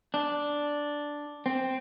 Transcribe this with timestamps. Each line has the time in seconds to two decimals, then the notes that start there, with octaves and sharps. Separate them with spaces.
0.14 D4
1.46 C4